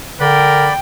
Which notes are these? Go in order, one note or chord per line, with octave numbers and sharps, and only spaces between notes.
D3 A#4 D5 G5 B5